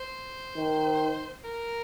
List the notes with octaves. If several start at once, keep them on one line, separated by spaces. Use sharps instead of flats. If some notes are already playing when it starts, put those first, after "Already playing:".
Already playing: C5
D#3
A#4